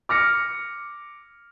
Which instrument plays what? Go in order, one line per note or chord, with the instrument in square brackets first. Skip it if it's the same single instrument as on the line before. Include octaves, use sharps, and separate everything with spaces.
[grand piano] D6 F6 A#6 C#7